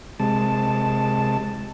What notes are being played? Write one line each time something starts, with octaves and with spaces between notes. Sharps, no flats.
C3 G#3 A5